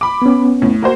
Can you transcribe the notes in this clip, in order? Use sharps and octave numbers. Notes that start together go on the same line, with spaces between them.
B5 D6
B3 C#4
A2
A#3 F#4 C5